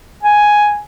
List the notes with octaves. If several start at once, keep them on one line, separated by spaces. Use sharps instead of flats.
G#5